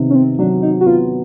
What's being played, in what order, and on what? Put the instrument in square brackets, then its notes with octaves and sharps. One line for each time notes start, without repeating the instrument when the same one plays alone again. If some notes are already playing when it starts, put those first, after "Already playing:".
Already playing: [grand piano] C3 D#3 B3
[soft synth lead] C#4
C4
[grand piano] F#3 [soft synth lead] D4
[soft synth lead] D#4
F#4
[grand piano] B3 [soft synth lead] F4